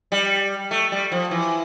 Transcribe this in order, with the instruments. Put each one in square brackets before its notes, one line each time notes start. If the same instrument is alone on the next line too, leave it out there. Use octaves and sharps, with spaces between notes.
[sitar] G3
A3
G3
F3
E3